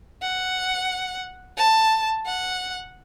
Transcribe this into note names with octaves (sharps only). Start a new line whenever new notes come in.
F#5
A5
F#5